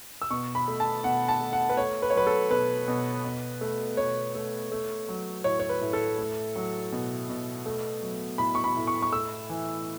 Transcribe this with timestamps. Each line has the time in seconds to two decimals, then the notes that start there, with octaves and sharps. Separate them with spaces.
0.22 E6
0.31 B2 C#6
0.55 B5
0.68 A3
0.80 A5
1.04 B2 F#5
1.28 A5
1.41 A3
1.53 F#5
1.69 B4
1.77 A3 C#5
2.02 B4
2.10 C#5
2.14 F#3 B4
2.27 A4
2.50 B2 B4
2.88 B2
3.24 B2
3.61 A3
3.97 B2 C#5
4.35 A3
4.72 A3
5.09 F#3
5.44 A2 C#5
5.60 C#5
5.69 B4
5.81 A2
5.93 A4
6.18 A3
6.56 F#3
6.92 B2
7.29 B2
7.66 A3
8.02 F#3
8.38 A2 B5
8.55 C#6
8.64 B5
8.76 A2
8.87 C#6
9.02 C#6
9.12 A3 E6
9.50 E3